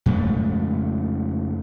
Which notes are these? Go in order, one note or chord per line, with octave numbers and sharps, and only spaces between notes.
F2 C#3 G#3 A3